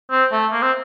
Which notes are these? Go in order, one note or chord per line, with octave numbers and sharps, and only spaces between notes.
C4
A3
A#3
C4